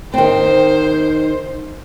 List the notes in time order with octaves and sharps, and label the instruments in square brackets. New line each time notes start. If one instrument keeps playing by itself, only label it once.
[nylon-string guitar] D#3 C4 [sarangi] C5